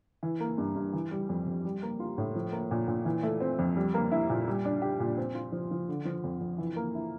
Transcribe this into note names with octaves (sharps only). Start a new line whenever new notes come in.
E3
A#3
G2
G2
E3
G3
F2
F2
G3
A#3
F4
A2
F3
A#3
A#2
A#2
E3
A3
C4
F2
G3
A#3
E4
A#2
G3
D4
G4
A#2
C4
F4
F3
F3
D3
F3
F2
F2
E3
A#3
E4